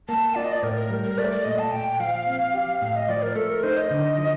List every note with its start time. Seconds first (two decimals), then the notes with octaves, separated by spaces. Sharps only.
0.08 A#3 A5
0.35 F4 D5
0.44 D#5
0.52 D5
0.63 A2 A#4
0.76 A#4
0.90 G3
1.04 A#4
1.18 A3 D5
1.31 D5
1.44 A#2 D#5
1.59 A5
1.72 A#2 G5
2.00 F3 F5
2.27 C4
2.54 G4
2.81 A2 F5
2.95 D#5
3.09 F3 D5
3.22 A#4
3.35 A3 A4
3.50 A#4
3.63 D#4 C5
3.77 D#5
3.91 D3
4.18 F3